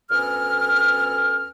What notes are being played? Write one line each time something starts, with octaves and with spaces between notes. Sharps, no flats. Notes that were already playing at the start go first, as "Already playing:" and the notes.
D2 B3 C#4 A4 F6